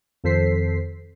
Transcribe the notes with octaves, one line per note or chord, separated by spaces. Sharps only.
F2 D#3 A4 C5 B6 C7